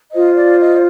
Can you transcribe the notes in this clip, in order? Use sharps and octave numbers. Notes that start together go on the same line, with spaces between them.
F4 C5 D#5
D5
D#5